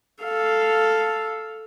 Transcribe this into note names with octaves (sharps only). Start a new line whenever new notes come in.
A4 F5